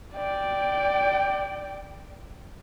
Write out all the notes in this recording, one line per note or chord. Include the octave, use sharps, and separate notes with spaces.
D5 G5